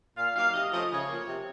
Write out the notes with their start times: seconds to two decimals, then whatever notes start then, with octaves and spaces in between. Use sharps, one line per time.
0.17 A#2 F5
0.36 F#3 A#3 D#4 F5
0.54 C3 D#5
0.72 F3 A3 C#4 D#5
0.90 C#3 C#5
1.08 F3 A#3
1.27 C3